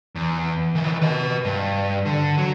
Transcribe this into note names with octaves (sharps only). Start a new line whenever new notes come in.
E2
D#3 E3
B4 D#5
G2
D3
F#3